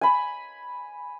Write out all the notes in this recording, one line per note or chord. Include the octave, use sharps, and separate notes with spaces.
G#5 B5